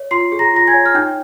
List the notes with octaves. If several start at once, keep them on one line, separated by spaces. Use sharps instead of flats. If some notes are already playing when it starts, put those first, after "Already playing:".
Already playing: C#5
F4 C6 C7
G#4
A#5 A#6
F4 A#6
G#5 G#6
C#5
F6
D#4 G5 G6